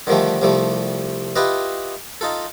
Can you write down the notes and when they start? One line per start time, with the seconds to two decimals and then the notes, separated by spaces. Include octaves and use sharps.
0.07 D3 D#3 F3 G3 A3
0.42 C2 F3 G3 A3
1.36 E4 F4 G4 B4 D#5
2.21 D#4 F4 A4